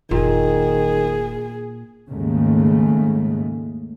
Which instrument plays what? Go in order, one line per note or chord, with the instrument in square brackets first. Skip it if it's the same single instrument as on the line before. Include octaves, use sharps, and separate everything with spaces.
[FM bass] F1 [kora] A#2 [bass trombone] D#3 [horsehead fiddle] G#4
[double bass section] D#2 G#2 C#3 G#3 A3